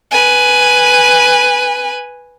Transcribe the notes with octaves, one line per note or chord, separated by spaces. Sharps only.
B4 G#5